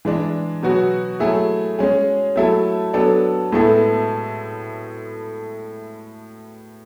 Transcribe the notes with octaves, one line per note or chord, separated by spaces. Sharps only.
E3 G#3 D4
B2 F#3 B3 F#4
F#3 A3 E4 G#4
G#3 C#4 G#4
F#3 A3 E4 A4
F#3 B3 D4 A4
A2 G#3 B3 E4 A4